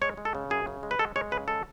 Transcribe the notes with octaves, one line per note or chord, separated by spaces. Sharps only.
G#3 C#5
G#3
A4
C#3
F#2 G#4
C#3
G#3
B4
G#3 A4
G#3 C#5
C#3 B4
G#3 A4